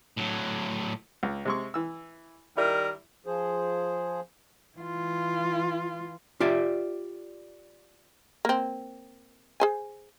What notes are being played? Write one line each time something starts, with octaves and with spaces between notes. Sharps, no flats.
A2 F#3
C#2
C3 G#3 C#6
E3 E6
D#3 G3 E4 A#4
F3 G#4 C5
E3 F4
F4 G4 D5 E5
A#3 C4
G#4 C5 G#5